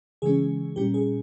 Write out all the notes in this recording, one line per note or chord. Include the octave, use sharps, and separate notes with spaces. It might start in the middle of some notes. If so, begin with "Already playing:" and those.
C#3 E3 G#3 C#4 G#4
A#2 G3 C#4 G4
G#4